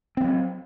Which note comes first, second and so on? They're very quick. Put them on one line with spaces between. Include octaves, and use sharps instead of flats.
C4 G3 F#3